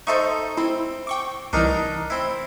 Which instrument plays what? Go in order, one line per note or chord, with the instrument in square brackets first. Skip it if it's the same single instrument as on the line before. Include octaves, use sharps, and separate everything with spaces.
[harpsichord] D#4 A4 [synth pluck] C5 E5 C#6
[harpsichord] C4 [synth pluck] E4
[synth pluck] G5 C#6 D6
[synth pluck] C2 E3 [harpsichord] D4 D#4 A#4
[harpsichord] C4 E4